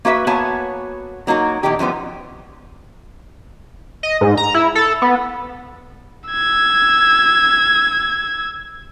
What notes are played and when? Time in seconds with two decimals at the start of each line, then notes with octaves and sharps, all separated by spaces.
0.05 A#3 F#4 B4 E5
0.27 A#3 B3 F#4 C#5 G#5 A5
1.27 F#3 A#3 D#4 F#4
1.63 E2 B2 D4 D#4 G4
1.79 F#2 F3 G3 B3
4.03 D#5
4.21 G#2
4.37 A#5
4.55 E4
4.75 A4
5.02 B3
6.29 E6 G#6